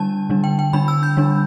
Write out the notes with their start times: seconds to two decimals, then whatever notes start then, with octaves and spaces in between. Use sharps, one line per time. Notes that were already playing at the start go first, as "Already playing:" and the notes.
Already playing: D3 G3 D4 A5
0.30 D3 G3 D4
0.44 G5
0.59 G5
0.73 D3 G3 D4 B5
0.88 E6
1.03 G6
1.17 D3 G3 D4